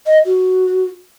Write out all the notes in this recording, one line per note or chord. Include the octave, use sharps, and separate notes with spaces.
D#5
F#4